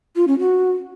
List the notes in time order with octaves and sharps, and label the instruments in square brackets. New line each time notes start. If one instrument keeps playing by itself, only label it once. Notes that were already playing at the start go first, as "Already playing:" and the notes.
[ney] F4
C#4
F#4